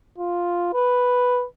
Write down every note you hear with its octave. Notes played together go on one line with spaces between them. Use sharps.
F4
B4